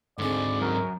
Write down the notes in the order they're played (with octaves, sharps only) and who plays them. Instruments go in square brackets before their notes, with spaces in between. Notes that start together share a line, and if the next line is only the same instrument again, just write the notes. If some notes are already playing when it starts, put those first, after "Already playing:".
[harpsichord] D2 G#3 [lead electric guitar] G#2 C4 [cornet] D5
[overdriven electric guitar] F#2 [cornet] A#4